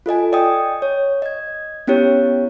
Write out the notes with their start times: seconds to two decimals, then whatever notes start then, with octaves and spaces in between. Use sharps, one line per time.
0.06 F4 A4 D#5 G#5
0.32 D5 D#5 G5 D#6
0.82 C#5
1.22 D#5 G#6
1.87 B3 C#4 E4 G4 C#5